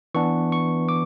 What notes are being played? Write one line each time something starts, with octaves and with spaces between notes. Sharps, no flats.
E3 B3 D4 C#6
C#6
D6